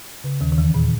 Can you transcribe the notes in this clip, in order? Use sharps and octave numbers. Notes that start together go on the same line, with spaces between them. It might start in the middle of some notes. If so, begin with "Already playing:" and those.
C#3
D#2 D#3
D#3
E2 E3
A#2